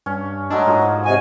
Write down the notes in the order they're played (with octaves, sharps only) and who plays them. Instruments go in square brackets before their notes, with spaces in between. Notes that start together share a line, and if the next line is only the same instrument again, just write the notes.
[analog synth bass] G2 [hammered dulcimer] C#4
[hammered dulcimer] F#3 G#3 A3 [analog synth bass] D4 [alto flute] D#5
[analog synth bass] G#2 [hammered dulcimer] F3 A#3 F#4
[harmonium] C3 G#5 [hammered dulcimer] C#5 [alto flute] D#5